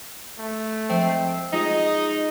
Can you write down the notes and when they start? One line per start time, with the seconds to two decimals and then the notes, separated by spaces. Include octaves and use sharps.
0.39 A3
0.90 F3 G#3 C4 E5
1.53 G#3 D#4 F4 G#4 D#5